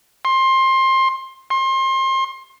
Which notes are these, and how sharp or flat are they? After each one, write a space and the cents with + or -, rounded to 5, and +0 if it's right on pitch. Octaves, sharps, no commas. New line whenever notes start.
C6 +20
C6 +30